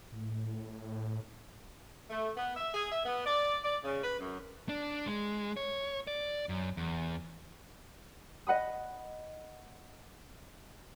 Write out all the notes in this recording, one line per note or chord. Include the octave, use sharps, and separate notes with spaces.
A2
A3
B3
E5
G#4
E5
B3
D5
D5
C#3
B4
F#2
D4
G#3
C#5
D5
F#2
E2
D#5 F#5 B5 D#6